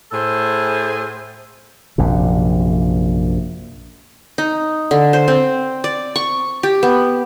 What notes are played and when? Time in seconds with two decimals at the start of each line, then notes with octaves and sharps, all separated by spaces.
0.12 A2 G#4 A4 C5
1.98 A#1 F#2 C3
4.38 D#4
4.91 D3
5.13 C5
5.28 C4
5.84 D5
6.16 C#6
6.63 G4
6.83 B3